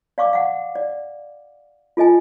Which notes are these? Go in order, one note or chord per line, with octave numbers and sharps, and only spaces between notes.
D5 F5 C#6 D6
F5 F#5
D5
F4 A4 D#5 G#5